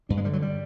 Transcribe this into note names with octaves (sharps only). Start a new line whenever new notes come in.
G2 D4
G#3
D3 G3
F#3
G3